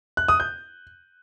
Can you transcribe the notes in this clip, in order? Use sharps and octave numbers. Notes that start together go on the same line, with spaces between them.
F#6
D#6
G6